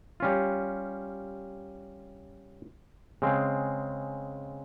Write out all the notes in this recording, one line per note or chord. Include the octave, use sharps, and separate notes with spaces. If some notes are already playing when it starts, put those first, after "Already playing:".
G3 C#4 F4
C#3 G#3 C4